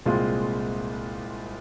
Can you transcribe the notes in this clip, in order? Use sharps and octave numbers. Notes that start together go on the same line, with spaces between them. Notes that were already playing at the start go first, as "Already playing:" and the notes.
C2 A#2 G#3 C4 F4